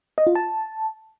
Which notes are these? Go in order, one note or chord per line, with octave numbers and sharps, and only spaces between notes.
D#5
F4
A5